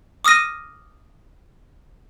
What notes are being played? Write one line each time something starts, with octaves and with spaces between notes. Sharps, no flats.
D6 D#6 F6 A#6 D#7